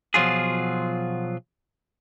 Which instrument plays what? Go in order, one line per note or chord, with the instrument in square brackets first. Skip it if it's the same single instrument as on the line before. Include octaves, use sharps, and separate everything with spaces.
[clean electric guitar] B2 F3 F#3 F4 G#4